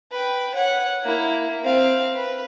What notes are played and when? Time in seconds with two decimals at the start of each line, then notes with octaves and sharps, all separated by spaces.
0.12 B4 G5
0.54 C#5 F#5
1.03 A#3 E4
1.63 C4 F5
2.15 B4